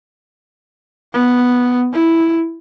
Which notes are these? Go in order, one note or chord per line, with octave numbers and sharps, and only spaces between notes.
B3
E4